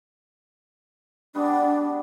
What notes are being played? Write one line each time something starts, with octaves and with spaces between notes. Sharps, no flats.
G3 B3 D4 F#4